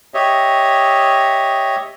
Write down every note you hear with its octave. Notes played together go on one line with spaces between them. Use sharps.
G4 C#5 D#5 E5